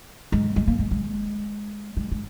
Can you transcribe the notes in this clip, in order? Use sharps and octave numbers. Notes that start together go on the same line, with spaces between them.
G#3
G#3
A#3
G#3
G#3
G#3
G#3